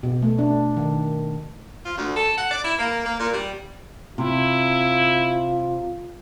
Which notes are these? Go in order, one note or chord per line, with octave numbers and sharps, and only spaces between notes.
B2
A3
D4
D#3
F4
D2
A4
F#5
D5
E4
A#3
A#3
A#2
G3
C3 E4 F4